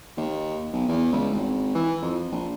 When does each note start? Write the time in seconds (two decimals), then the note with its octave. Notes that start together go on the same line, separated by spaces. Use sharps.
0.17 D#2
0.73 B1
0.88 E2
1.12 C#2
1.32 G#1
1.75 E3
2.02 F2
2.31 A#1